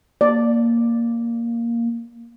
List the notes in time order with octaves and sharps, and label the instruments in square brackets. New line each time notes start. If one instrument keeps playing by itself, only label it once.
[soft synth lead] A#3 [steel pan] D5